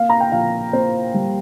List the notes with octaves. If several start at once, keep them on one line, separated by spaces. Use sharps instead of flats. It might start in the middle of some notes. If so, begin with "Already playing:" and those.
Already playing: A#3 F5
A#5
G5
A#1 F5
A#3 C5
G3